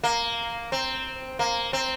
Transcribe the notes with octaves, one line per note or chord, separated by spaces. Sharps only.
A#3
C4
A#3
C4